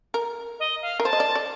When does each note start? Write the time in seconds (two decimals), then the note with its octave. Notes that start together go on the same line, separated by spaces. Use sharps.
0.14 A#4
0.60 D#5
0.82 F5
1.00 A#4
1.05 C5 A5
1.13 D#5
1.20 D5
1.35 D5